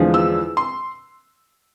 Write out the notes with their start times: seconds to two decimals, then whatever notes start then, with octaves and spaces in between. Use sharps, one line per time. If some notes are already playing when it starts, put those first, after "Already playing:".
Already playing: E2 D3 F3 G#3
0.14 E6
0.57 C6